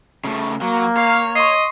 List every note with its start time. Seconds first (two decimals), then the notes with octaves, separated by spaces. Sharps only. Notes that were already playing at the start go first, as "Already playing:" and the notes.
0.24 C#3 A3
0.62 F#3 A#3
0.97 C#5 F5
1.35 D#5 C6 C#6 C7